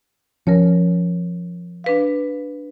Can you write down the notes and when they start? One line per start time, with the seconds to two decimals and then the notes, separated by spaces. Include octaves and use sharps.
0.47 F3 C#4 A#4 C#5
1.84 D4 B4 F5